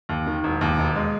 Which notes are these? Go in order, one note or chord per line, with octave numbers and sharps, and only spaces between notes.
D#2
D#3
E1
D#2
E1
G#3